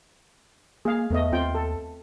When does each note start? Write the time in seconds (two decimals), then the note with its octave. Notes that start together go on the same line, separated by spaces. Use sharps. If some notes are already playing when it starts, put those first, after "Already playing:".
0.85 A#3 G#4 F5
1.10 E2 A3 B3 D#5
1.32 D#2 C4 F4 G5
1.55 A4